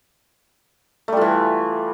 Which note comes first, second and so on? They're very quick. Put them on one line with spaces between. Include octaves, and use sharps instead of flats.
A3 G3 F4 E3